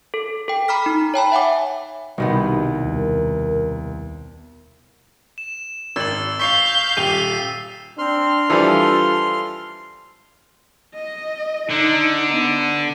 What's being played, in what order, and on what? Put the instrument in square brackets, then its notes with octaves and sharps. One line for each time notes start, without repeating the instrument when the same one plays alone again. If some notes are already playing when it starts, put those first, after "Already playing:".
[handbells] A4
A4 G5
A#5 B5 D6 F6 B6
D#4
C#5 G5 A5 B5
E5 F#5 G#5 D6
[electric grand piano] C2 [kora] B2 D#3 B3 [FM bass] G3
[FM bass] D#2 [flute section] A#4
[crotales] E7
[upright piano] G#1 F#7 [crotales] E6 A6
[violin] F5 G6 [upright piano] C#6 C7 [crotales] B6
[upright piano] D#1 G4 F7 [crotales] B6 C7 D#7
[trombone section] C4 [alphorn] D4 [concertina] C6 F6
[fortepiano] E3 F3 G3 [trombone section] F4 A4
[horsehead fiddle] D#5
[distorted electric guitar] D3 [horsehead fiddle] D#4
[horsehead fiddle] B3